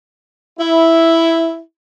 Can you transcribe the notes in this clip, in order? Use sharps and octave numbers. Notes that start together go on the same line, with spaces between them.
E4